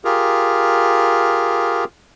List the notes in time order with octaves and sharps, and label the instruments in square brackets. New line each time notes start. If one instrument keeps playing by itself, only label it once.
[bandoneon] F4 G4 G#4 A#4